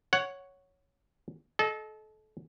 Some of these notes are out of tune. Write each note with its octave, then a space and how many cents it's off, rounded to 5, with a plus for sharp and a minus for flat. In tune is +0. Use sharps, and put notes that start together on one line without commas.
C#5 +0 F#5 +0
A4 -30 D#5 +0